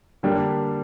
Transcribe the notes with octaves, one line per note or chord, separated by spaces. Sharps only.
D3 G3 A#3 D4 G4